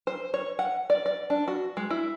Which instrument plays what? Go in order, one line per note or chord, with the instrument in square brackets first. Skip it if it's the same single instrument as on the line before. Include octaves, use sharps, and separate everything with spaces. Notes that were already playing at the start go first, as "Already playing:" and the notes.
[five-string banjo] C5
C#5
F#5
D5
D5
D4
F#4
G#3
E4